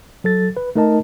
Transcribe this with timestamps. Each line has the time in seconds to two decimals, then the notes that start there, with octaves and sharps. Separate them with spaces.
0.24 F#3 A4 A6
0.57 B4
0.75 A3 D#4 A#4 D#5 A5